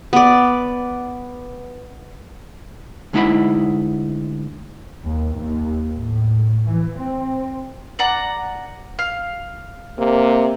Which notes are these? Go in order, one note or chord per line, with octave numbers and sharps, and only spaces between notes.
B3 D5
D2 G#3 D#4 E4 F#5 B5
D#2
D#2
A2
E3
C4
D5 F#5 A#5
F5
C3 A#3